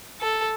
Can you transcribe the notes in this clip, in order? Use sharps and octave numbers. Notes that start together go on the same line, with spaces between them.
A4